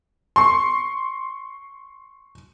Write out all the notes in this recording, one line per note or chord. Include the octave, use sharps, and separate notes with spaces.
C6 C#6